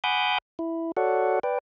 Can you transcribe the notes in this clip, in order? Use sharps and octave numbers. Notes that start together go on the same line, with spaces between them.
F#5 G#5 B5 D6 D#6 G6
E4
F#4 A4 C#5 D5 F#5
B4 D5 G5